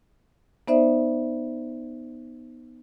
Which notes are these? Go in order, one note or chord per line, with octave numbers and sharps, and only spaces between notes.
B3 D#4 C5 D5 E5